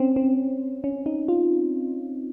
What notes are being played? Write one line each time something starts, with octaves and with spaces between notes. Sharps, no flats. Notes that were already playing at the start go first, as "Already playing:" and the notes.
Already playing: C4 C#4
C4
C#4
D#4
F4